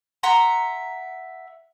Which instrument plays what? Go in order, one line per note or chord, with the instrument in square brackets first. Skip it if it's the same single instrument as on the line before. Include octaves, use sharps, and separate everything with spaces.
[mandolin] E5 F#5 A#5 C6